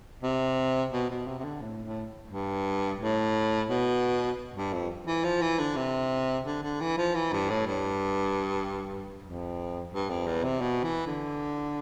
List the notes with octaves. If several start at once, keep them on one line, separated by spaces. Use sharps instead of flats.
C3
B2
B2
C3
C3
D3
A2
A2
G2
A2
B2
G2
F2
E3
F3
E3
D3
C3
D3
D3
E3
F3
E3
G2
A2
G2
F2
G2
F2
E2
C3
B2
E3
D3